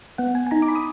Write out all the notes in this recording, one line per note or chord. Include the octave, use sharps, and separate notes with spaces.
B3 F#5
G#5
G#5
D#4 A#5
D6
B5
D#6